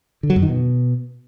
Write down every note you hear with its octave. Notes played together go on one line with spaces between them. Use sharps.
D3
F#3
F#2
D#3
B2